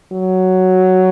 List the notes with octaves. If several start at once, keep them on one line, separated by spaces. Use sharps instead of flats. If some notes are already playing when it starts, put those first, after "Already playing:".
F#3